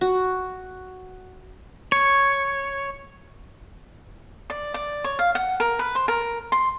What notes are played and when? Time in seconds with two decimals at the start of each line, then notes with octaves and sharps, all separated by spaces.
0.01 F#4
1.92 C#5
4.50 D5
4.74 D5
5.04 C#5
5.19 F5
5.35 F#5
5.60 A#4
5.79 B4
5.95 C5
6.08 A#4
6.52 C6